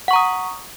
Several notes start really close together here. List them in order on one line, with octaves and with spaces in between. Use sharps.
F#5 C#6 A#5 D#6